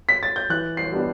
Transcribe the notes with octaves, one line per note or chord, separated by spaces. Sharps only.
B6
A6
G6
E3 F#6
C7
G3 B3 D4